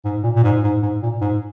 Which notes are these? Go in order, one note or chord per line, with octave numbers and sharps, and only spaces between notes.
G#2
A#2
A#2
G#2
G#2
G#2
A#2
G#2